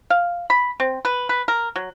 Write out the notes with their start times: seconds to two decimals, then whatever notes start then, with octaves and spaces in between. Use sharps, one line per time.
0.10 F5
0.50 B5
0.80 C4
1.05 B4
1.29 B4
1.48 A#4
1.76 F#3